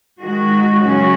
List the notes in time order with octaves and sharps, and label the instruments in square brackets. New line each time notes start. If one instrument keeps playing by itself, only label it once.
[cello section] D#3 G#3 F#4
F#2 C#3 F#3 C#4 F#4